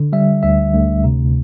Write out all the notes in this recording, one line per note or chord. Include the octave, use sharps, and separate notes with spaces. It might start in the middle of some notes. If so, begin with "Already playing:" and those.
Already playing: D3
G3 E5
D2 E5
D2
C3